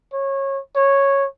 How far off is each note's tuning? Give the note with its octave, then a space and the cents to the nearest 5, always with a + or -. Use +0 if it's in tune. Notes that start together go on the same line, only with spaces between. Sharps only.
C#5 -20
C#5 -5